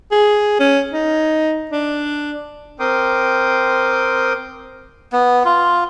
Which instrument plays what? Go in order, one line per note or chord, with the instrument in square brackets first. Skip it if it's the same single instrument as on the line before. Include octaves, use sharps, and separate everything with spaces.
[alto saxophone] G#4
C#4
D#4
D4
[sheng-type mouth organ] C4 A#4 G5 C6 D6 D#6
[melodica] B3
F4